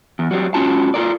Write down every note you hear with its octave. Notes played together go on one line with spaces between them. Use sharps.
E2
F#3 G3 C4
G#2 C#4 F4 F#4 A5
F4 A4 A#4 D5